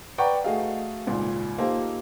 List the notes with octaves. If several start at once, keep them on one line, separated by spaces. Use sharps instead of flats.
B4 D5 F#5 G5 A#5 C#6
A3 F#4 G#4 D#5 F5
G#1 C#2 A#2
A#3 D#4 F4 G4 A4 C5